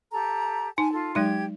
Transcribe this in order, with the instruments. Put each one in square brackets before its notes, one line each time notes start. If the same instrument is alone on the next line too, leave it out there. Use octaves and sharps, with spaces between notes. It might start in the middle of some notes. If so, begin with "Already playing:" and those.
[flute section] G4 A4 A#5
[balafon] D#4 [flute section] G#5 A5
[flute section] F4 A4
[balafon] F#3 G#3 D#4 [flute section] G4 G#6